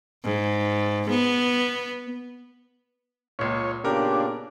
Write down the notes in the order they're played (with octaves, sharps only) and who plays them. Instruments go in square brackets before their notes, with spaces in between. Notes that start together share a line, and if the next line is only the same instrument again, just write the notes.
[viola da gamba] G#2
B3
[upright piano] C#2 A#2 [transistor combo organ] C#5
[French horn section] A#2 C#3 B3 [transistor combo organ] D4 [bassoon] G4 [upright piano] A#4